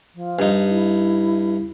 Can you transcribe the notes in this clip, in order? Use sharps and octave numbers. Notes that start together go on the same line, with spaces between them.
F3
G2 D#4
E4